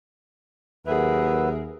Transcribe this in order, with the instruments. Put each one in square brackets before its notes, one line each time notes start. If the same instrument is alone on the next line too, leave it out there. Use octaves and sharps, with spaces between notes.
[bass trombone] D#2 [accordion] F#3 B4 E5 [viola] G#4 A#4